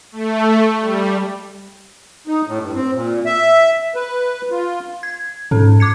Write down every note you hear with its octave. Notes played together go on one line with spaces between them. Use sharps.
A3
G3
D#4
A2
G2
C4
A#2
E5
B4
F4
G#6
G#2 C#4 A4
D6 G#6 C#7